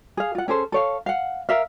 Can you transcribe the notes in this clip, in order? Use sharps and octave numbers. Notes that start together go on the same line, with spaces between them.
G#4 F5
F4 F#5
C#4 G#4 A4 C5
A4 C#5 F5
F5 F#5
A#4 E5 F5